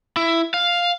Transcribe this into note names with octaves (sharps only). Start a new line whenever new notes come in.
E4
F5